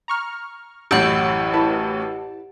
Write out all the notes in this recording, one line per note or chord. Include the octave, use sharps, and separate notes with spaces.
A#5 C#6 F6
A1 F#2 A2 G4 F#5 E6
E4 B4 A5